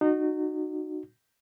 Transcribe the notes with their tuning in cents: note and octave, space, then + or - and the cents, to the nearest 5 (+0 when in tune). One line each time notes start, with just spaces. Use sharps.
D#4 -30 F#4 +0